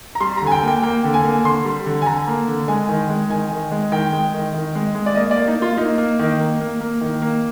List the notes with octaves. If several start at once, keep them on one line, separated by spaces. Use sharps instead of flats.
A#5
G3 C6
A#5
D3
G#5
G5
A#3 G5
A#3 G5
D3
G#5
A#3
D3 C6
G3
D3
G#5
D3 A#5
A#3
D3
G#3 G#5
D#3
G#3
D#3 G#5
D#3
G#3
D#3 G5
G#3
D#3
D#3
G#3
G#3
D5
A#3 D#5
D5
A#3
D#4
A#3
F4
A#3 D#4
A#3
D#3
A#3
A#3
A#3
D#3
A#3